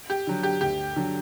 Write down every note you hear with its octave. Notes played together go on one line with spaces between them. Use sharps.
G4
D3 F#3
G4
D2 G4
D3 F#3